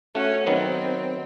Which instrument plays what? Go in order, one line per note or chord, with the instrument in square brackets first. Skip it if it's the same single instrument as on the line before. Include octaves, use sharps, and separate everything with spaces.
[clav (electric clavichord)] A3 F#4 [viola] C#4
[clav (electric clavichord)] D#3 F#3 B3 [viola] C4